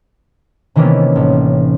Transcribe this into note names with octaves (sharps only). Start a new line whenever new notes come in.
C3 D#3 E3 A#3 B3 C#4
A1